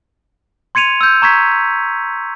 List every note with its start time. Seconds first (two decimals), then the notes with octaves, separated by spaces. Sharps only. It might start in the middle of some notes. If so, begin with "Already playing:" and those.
0.75 C6 G#6 C#7 D#7 F7
1.01 E6 G6
1.22 A#5 C#6 G#6 B6